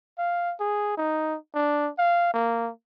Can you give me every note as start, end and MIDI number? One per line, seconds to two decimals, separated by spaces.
0.18 0.55 77
0.60 0.93 68
0.97 1.36 63
1.54 1.90 62
1.98 2.32 77
2.34 2.71 58